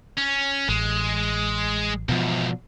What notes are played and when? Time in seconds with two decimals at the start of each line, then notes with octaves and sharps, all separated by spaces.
0.17 C#4
0.69 A1 G#3
2.09 E2 G#2 B2 F3